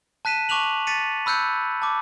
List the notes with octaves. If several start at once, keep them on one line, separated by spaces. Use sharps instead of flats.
A5 F#6 B6 D#7 E7
A5 C#6 D6 F#6 F7 F#7
A6 B6 C#7 D#7
B5 E6 F#6 G6 C#7
A5 D6